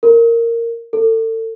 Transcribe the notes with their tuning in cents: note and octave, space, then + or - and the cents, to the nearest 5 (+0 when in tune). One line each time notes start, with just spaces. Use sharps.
A#4 -10
A4 +35